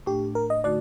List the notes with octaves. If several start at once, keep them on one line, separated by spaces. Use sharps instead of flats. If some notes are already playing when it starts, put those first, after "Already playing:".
A2 A3 D4 G4
A#4
D#5
D3 A3 D#4 F#4 D5